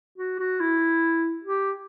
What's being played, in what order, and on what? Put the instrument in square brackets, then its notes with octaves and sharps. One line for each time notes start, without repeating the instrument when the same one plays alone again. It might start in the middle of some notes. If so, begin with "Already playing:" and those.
[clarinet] F#4
F#4
E4
G4